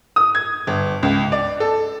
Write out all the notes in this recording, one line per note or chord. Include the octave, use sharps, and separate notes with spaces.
D#6
G#6
G1
C#2
D5
A4